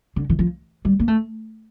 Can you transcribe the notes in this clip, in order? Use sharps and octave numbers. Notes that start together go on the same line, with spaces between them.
D3
E3
F3
G3
A#3
A3